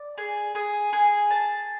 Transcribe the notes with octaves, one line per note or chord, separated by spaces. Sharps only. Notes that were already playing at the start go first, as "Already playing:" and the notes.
Already playing: D5
G#4
G#4
G#4
A5